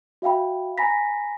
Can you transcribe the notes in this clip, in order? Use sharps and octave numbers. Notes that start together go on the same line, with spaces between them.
F#4 E5 F5 G5 B5
G#5 A#5 B5 A#6 B6